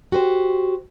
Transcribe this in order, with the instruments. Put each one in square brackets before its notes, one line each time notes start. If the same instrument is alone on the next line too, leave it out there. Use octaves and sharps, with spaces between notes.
[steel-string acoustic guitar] F#4 G4 B4 C5